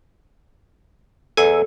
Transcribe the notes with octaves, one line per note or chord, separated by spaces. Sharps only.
E2 A4 G#5